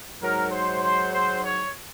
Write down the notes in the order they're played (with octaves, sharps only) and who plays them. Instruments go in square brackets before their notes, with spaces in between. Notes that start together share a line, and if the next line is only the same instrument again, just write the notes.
[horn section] G#2 F#3 A#4
C5
C5
C5
C#5